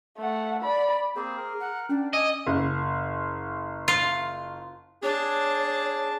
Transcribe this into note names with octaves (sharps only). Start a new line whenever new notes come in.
A3 F#5
D5 B5
A#3 C4 G#4 C5
A#4
F#5
C#4 D4
D#5 G#5 D6 E6
F#1
F4
D4 G#4 C#5 A5